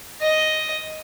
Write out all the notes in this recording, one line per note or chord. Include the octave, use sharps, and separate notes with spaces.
D#5